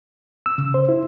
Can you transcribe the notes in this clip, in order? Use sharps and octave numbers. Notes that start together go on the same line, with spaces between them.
E6
C#3
C5
E4